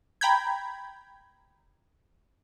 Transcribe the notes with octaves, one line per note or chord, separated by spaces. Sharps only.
G5 A#5 B5 G6 G#6